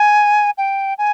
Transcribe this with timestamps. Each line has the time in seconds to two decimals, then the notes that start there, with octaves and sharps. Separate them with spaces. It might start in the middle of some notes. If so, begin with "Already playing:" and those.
Already playing: G#5
0.58 G5
0.98 G#5